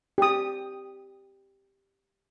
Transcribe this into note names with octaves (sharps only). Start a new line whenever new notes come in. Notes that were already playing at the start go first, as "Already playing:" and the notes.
G4 D#6